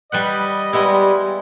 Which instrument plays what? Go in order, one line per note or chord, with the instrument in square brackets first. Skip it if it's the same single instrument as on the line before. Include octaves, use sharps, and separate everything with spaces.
[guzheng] G3 B4 F#5 [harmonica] D#5
[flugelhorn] G3 [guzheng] G#3 B3 E4